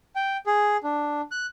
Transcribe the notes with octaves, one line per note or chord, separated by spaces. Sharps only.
G5
G#4
D4
F#6